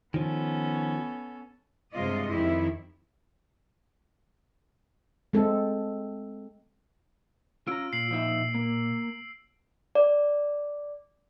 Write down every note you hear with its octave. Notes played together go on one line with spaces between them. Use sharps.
D#3 F3 B3 C#4 A4
G2 C3 G#3 F4 D5 D#5
F2 D#3 E4 G4
G#3 C4 A4
C#4 F4 A#5 E6 D7
A#2 C7 F#7
F3 D#4 E5
A#3
D5